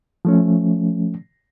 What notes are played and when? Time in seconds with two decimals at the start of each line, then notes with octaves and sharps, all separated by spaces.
0.25 F3 A3 C#4